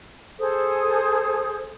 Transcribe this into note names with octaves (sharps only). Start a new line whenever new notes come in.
G#4 A4 C5 D#6